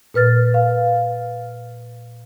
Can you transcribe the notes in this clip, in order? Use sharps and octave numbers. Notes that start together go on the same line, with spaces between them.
A#2 B4 F6 A6
F5